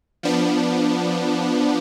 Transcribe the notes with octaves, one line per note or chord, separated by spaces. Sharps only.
F3 B3 D4